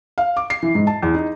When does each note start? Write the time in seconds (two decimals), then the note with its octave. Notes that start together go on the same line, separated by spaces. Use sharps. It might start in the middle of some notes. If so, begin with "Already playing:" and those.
0.18 F5
0.37 D6
0.50 C7
0.63 E3
0.75 G#2
0.87 A5
1.03 E2
1.15 D#4